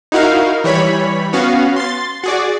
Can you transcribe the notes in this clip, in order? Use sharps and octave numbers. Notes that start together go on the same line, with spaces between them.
D#4 E4 F#4 A#4 F5
E3 G3 C#5 B5
B3 C#4 F#4 F5
C6 A6
F#4 G#4 D5